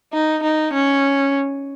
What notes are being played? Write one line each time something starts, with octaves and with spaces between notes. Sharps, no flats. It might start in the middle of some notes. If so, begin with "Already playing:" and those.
D#4
D#4
C#4